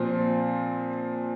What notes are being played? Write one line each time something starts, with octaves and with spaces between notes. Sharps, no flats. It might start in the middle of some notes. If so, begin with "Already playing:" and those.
Already playing: A#2 F3 C4